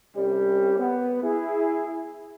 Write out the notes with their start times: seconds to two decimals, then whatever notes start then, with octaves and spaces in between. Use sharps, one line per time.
0.16 C2 C3 G3 C#4 G4
0.79 B3
1.23 E4 G#4